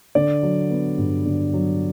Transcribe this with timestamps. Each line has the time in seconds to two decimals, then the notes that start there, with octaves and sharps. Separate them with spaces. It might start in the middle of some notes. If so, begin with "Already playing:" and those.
0.15 D3 D5
0.43 F#3
0.70 B3
0.98 G2
1.25 D3
1.54 F#3